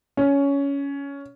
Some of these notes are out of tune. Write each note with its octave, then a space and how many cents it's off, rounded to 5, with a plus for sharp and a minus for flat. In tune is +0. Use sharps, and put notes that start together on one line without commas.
C#4 +15